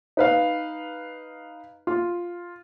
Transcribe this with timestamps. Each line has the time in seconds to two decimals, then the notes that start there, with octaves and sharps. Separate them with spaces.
0.17 D#4 B4 F5
1.87 F4